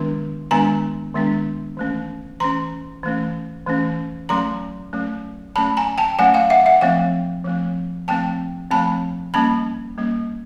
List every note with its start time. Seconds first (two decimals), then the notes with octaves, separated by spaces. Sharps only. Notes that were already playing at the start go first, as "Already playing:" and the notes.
Already playing: D#3 G#3 B3 D4
0.51 D#3 G#3 B3 D4 G#5 A#5
1.14 D#3 G#3 B3 D4
1.77 E3 A3 C#4
2.40 E3 A3 C#4 A#5 C6
3.03 E3 A3 C#4
3.67 E3 A3 C#4
4.29 F#3 A3 C#4 A#5 C6
4.93 F#3 A3 C#4
5.56 F#3 A3 C#4 A5 B5
5.77 G#5 A#5
5.98 G5 A5
6.19 F#3 A3 C#4 F#5 G#5
6.34 F5 G5
6.50 E5 F#5
6.66 E5 F#5
6.81 F3 A3 C4 F5 G5
7.45 F3 A3 C4
8.08 F3 A3 C4 G5 A5
8.71 F3 A3 C4 A5 B5
9.34 G3 A#3 C#4 A5 B5
9.98 G3 A#3 C#4